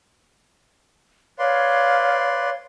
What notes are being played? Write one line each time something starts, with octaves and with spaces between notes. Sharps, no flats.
B4 C#5 D5 F5 C6